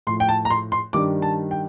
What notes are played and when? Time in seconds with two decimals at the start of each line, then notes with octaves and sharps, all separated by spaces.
0.07 A2 F3 C6
0.20 G5
0.29 A5
0.45 A#5
0.50 C6
0.72 C6
0.93 G2 D#3 G3 D6
1.22 A5
1.51 G5